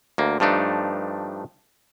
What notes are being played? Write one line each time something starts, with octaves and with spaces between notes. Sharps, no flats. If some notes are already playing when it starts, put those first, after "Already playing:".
D2 A#3
G2 F3 A3 D4 D#4